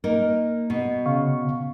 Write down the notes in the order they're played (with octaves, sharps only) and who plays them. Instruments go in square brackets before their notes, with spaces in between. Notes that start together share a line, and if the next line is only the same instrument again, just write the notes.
[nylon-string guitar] A#3 D#4 A#4
B2
[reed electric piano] C#3 F5 C#6